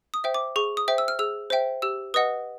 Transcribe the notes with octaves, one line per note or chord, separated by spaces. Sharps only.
D#6
C5 E5 G5
D6
G#4 C#6
D#6
C5 E5 G5
E6
F6
G#4 E6
C5 E5 G5
G4 E6
B4 D#5 F#5 D#6